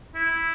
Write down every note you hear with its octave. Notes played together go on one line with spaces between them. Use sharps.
E4